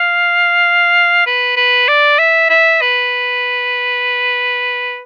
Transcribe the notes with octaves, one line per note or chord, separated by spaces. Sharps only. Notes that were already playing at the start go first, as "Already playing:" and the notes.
Already playing: F5
B4
B4
D5
E5
E5
B4